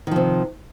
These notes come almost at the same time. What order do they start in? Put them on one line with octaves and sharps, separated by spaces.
D#3 F3 C3